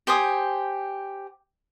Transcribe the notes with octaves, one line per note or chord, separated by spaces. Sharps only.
G4 C5 G#5 D#6